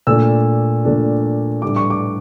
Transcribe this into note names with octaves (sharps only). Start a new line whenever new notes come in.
A#2 A3 D4 E6
A#2 A3 D4
A2 G3 D4 D6
C#6
D6